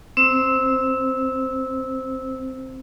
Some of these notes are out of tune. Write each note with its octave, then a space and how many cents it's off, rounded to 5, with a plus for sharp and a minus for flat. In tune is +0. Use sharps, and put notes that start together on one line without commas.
C4 +0 C5 -5 E6 -15